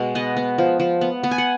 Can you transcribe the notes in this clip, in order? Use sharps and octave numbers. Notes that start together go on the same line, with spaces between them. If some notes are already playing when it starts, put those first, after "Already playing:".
Already playing: B2 G#3
B3 D#5
B3
F3
F3
B3
B3
G#5
F#5